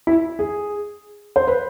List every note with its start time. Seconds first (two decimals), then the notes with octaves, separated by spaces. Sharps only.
0.07 E4
0.39 G#4
1.36 C5
1.47 B4